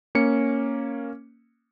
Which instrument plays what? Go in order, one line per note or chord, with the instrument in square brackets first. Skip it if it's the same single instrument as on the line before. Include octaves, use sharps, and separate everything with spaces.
[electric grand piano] A#3 C#4 C#7